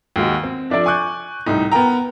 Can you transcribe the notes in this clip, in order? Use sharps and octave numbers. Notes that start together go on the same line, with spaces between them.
D#2 G#3 F#4
C4
F3 D4 A4 D5
G#5 C#6 D6 F#6 G6
C2 A2 D#4
B3 A#4 G5 A#5